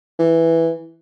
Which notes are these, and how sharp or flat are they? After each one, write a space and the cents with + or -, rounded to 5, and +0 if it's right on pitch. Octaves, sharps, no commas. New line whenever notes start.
E3 +0